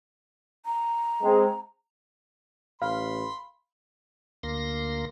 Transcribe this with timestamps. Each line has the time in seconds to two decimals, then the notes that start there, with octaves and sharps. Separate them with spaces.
0.66 A#5
1.23 G#3 C4
2.82 A1 F5 B5 C6
4.43 D2 A#3 C6 A#6